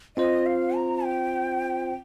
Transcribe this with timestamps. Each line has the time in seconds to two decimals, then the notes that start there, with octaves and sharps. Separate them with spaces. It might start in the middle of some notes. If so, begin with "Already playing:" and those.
0.17 C4 F4 C5 D#5
0.46 F5
0.76 A#5
1.05 G5